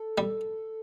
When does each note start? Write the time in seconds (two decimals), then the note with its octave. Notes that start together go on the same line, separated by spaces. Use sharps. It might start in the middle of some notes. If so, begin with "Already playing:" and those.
Already playing: A4
0.18 G3